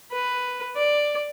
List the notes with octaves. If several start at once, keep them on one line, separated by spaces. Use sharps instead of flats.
B4
D5